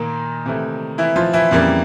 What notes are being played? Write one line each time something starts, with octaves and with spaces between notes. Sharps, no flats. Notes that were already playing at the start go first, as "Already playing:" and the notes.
Already playing: A#2 D#3 A#3
C3 E3 A3
E3 E4
F3 F4
E3 E4
F2 C#3 E3 G3 A#3